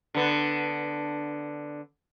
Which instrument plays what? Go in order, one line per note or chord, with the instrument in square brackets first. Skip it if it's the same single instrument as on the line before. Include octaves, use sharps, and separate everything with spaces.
[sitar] D3 B3